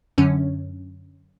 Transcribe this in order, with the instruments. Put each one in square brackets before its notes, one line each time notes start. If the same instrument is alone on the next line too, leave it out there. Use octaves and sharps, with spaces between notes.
[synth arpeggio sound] F#2 D3 C#4